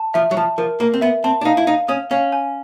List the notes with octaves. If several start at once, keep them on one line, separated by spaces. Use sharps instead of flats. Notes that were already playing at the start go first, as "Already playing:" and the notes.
Already playing: A5
F3 E5
F#3
F3 A5
F3 A#4
A#3 A#4
C4
B3 E5
C4 A5
D4
D#4 F5
E4
D#4 F5
C#4 D#6
C#4 F5
G#5